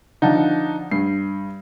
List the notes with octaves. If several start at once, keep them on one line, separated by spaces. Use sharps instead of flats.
D3 F3 D#4 F#5 A5
G2 C7